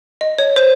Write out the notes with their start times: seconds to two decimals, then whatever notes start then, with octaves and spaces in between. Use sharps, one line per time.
0.21 D#5
0.39 C#5
0.56 C5